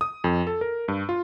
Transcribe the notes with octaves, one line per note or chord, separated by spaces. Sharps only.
D#6
F2
A4
A#4
G2
F4